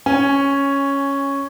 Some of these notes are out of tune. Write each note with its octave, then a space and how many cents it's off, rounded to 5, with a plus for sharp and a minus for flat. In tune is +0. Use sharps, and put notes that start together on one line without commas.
C#4 +0 C#5 +0 G#5 -10